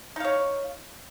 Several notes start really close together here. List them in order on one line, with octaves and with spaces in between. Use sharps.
D#4 F5 C#5